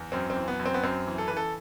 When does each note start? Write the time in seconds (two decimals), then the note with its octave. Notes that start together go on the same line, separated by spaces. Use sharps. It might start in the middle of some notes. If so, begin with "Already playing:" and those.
Already playing: E2
0.12 F#2 C4
0.30 C4
0.36 E3
0.48 B3
0.59 F#2
0.65 C4
0.74 B3
0.83 F#2 C4
1.07 E3
1.18 A4
1.28 E3 B4
1.37 A4